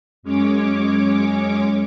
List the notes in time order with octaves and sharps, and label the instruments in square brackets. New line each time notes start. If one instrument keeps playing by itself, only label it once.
[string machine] F#2 G#3 C#4 C#5 D6